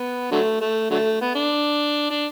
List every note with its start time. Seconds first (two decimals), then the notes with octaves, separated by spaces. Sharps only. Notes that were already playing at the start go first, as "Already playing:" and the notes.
Already playing: B3
0.32 D3 F#3 A3
0.61 A3
0.91 D3 F#3 A3
1.21 B3
1.35 D4
2.10 D4